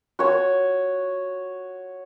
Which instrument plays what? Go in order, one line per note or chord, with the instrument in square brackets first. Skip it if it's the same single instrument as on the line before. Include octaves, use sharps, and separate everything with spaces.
[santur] F#4 C#5